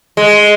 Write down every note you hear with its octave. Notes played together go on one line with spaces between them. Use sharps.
G#3